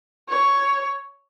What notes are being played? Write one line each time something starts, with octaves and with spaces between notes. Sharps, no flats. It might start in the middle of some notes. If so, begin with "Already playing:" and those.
C#5